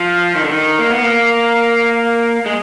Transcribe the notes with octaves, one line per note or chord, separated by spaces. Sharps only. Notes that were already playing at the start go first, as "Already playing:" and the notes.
Already playing: F3
D#3
D3
D#3
A#3
B3
A#3
G#3